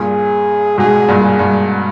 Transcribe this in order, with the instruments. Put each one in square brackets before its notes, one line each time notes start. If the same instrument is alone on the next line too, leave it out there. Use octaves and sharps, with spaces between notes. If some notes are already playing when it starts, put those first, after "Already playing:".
Already playing: [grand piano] G2 A#2 [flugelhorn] G#4
[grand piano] G#2 B2 [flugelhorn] G#4
[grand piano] G2 A#2
[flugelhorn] G#4
[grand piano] G2